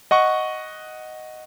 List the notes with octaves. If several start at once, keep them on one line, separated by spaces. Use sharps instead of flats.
D#5 F#5 C#6